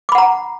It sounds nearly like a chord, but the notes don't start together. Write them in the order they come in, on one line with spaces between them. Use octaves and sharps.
D6 B5 F#5 A#5